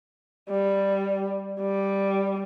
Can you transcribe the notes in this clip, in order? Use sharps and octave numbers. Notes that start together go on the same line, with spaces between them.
G3
G3